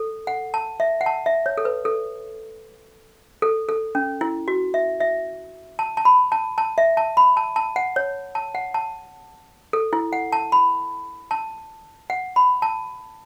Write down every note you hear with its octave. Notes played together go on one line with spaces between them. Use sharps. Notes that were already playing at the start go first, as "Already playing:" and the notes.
Already playing: A4
F#5
A5
E5
F#5
A5
E5
C#5
A4
B4
A4
A4
A4
C#4
E4
F#4
E5
E5
A5
A5
B5
A5
A5
E5
A5
B5
A5
A5
F#5
C#5
A5
F#5
A5
A4
E4
F#5
A5
B5
A5
F#5
B5
A5